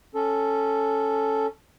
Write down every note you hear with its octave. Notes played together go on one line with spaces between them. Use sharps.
C#4 A4